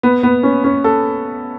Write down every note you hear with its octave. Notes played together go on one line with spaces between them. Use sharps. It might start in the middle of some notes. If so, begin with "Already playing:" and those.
B3
B3
C#4
C#4
A4